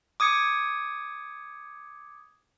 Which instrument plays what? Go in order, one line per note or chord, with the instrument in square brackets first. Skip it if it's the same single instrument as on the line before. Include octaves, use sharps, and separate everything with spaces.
[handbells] D6 D#6 G#6 C#7